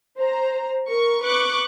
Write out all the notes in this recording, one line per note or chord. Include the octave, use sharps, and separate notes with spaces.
C5 A#5
A#4 C#6
B4 C#6 D6 F#6